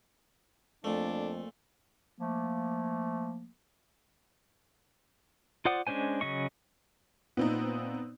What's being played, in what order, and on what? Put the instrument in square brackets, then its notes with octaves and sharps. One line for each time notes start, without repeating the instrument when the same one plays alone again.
[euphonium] F2 [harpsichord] A#2 A3 [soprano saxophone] D4
[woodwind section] F3 A3 A#3
[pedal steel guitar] F4 C5 D5 F#5 D#6
G#3 C#4 D4 C5 G#5
C#3 F#3 C#4 D#5 C#6
[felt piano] A#2 [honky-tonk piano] B3 C4 D#4